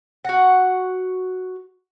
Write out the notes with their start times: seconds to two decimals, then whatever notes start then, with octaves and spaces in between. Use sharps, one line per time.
0.25 F#4 F#5